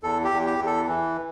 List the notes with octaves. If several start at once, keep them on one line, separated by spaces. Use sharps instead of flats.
E2 A4
G4
E2
G4
E2
A4
E3